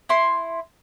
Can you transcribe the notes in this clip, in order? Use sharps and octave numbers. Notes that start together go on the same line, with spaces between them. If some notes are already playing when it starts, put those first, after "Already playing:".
E4 C6